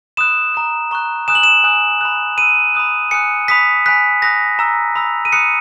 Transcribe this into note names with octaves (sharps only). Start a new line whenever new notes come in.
B5 D#6 F#6 E7
A#5 D#6 F#6
A#5 C#6 F#6
G#5 D#6 F#6 E7
F#7
E7
G#5 D#6 F#6
B5 D#6 F#6
B5 E6 D#7
B5 D#6 F#6
G#5 D#6 F#6 C#7
B5 D#6 F#6 B6
G#5 B5 F#6 B6
B5 D#6 F#6 A#6
A#5 E6
B5 E6
D#7
B5 D#6 F#6 C#7